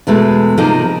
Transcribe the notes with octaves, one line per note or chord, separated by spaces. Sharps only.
E2 B2 G#3 A3
C3 F3 A#3 D#4 A#4